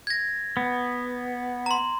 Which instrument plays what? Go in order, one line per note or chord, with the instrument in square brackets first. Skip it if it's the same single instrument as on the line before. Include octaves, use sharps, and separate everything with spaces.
[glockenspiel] G#6 A#6
[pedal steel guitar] B3
[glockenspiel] A#5 C6